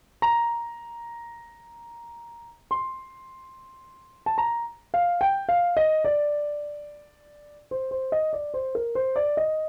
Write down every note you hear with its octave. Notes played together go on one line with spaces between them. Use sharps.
A#5
C6
A5
A#5
F5
G5
F5
D#5
D5
C5
C5
D#5
D5
C5
A#4
C5
D5
D#5